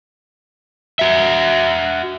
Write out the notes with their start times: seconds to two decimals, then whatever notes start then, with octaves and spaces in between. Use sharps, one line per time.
0.99 F#4 E5